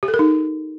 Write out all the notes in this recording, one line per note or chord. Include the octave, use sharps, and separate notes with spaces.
G4
A4
A#4
D#4